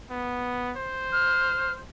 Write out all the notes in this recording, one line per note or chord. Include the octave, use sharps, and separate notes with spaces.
B3
C5
F6